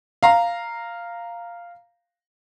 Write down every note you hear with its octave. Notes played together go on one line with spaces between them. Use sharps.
F5 A#5